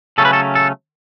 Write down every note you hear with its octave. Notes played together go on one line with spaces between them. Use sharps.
C#3 F#3 A3 C#4 A4
B4
A4
A4